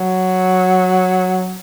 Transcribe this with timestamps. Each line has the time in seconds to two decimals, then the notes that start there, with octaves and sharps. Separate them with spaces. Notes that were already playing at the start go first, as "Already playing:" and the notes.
Already playing: F#3